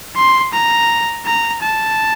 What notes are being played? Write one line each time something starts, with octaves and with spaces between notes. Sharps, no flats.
C6
A#5
A#5
A5